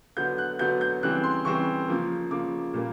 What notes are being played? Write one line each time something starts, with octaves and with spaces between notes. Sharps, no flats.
D3 F#3 B3 G6
F#6
D3 F#3 B3 G6
G6
C#3 E3 G3 C4 F#6
C6
C#3 E3 G3 C4 C#6
C#3 F3 A#3
C#3 F3 A#3 D6
A#2 G3 A#3